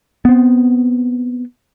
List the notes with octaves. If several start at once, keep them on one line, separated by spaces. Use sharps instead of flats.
B3 C4